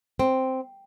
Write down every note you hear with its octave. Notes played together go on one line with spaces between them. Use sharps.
C4